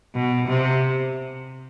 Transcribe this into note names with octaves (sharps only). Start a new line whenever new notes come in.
B2
C3